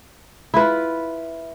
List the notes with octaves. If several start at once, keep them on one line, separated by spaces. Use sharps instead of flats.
E4 F4 B4